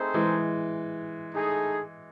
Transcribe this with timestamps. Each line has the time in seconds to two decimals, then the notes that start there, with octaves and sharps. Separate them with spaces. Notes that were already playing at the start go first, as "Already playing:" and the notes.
Already playing: A3 C4 D#4 G#4 C5
0.14 E3 G#3
1.33 A3 D#4 G#4